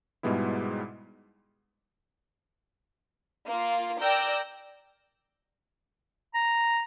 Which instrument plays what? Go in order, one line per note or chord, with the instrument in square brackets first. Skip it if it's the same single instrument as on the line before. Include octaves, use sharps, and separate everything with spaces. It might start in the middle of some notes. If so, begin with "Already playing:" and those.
[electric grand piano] G#2 B2 G3 G#3 B3 E4
[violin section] A#3 F4
A#4 D5 G5 E6 G6 A#6
[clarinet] A#5